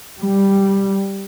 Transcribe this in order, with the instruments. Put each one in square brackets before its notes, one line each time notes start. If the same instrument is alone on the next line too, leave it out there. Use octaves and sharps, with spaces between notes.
[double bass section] G3